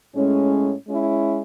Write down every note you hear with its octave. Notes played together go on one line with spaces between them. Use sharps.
A2 G#3 C#4
G#3 C#4 E4